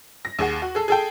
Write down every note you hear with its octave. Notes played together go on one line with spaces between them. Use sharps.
A#6
D#2 G#4 F#5
F#4
G#4 A4
G#4 A4 G5